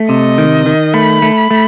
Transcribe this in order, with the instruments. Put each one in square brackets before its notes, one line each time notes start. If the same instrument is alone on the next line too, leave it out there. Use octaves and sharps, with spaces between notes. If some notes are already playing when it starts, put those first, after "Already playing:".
Already playing: [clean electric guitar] A3
[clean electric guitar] C3 [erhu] D#5
[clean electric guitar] D#3
D#3
[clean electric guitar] A3 [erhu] B5
[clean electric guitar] A3
[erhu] B5
[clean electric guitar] A3